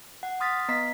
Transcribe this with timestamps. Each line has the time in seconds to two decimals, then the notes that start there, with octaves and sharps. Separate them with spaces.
0.23 F#5
0.40 C6 D#6 F6 A6 B6
0.69 B3 D#5 A#5 B6 C7